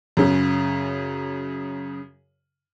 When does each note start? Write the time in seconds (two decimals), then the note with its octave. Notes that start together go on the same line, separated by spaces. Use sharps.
0.17 F#2 C#3